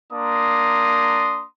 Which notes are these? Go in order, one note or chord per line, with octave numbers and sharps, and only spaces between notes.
A#3 D4 A#5 C6 D#6